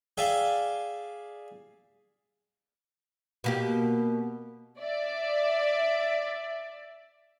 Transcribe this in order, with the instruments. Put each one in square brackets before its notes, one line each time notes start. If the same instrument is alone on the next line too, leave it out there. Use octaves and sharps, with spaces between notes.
[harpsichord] G#4 D5 E5 F5 G5 G#5
[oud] B2 A#3 G4
[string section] D5 E5